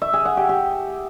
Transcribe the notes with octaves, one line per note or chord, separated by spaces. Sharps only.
E5
G#4
F#5
G4
G4